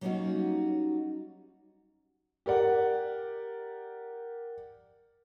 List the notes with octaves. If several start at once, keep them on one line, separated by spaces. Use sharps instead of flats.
F#3 G3 A#3 C#4 D#4 F#4
G4 A#4 D5 F#5